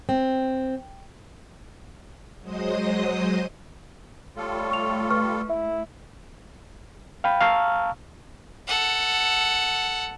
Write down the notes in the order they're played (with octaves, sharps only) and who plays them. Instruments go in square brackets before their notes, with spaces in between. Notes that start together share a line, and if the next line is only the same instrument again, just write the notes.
[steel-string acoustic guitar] C4
[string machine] F#3 G#3 C5 D#5 D#6
[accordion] G3 F4 A4 [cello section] A3 [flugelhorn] C#5
[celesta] C#6 F7
B4 C#6 F6
[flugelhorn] E4 [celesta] E5
[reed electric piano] F5 G5 B5
F5 A5 A#5 C#6 E6 F6
[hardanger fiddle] A4 F#5